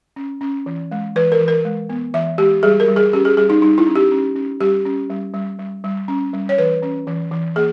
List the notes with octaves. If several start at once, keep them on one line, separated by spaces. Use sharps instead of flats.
C#4
C#4
E3
G#3
E3 B4
A#4
E3
A#4
G#3
B3
E3 E5
G#3 G4
G3 G#4
A#4
G3
G#4
C#4 G4
G#4
G3 G#4
D#4
G3 D#4
E4
C#4
G4
C#4
C#4
G3 G4
C#4
G3
G3
G3
G3
C#4
G3
C#5
E3 B4
C#4
E3
E3
A#3 G#4